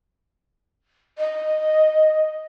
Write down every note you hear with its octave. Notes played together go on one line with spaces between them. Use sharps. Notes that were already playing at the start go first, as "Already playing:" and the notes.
D#5